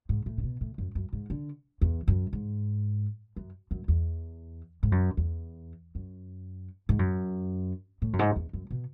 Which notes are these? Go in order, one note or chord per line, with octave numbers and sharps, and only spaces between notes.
G#2
A2
C#3
B2
A2
F#2
F#2
G#2
D3
E2
F#2
G#2
F#2
F#2
E2
G#2
F#2
E2
F#2
G#2
F#2
A2
F#2
G#2
E2
F#2
B2